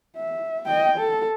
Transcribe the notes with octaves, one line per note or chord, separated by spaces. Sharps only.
E5
D#5 G5
A4